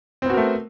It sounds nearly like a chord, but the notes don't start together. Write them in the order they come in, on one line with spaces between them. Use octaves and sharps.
C4 B3 F#4 A#4 A3